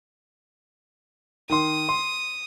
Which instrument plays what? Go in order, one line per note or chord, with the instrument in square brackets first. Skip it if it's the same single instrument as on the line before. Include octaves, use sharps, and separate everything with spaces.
[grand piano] D#3 C6 [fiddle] D#6
[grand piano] C6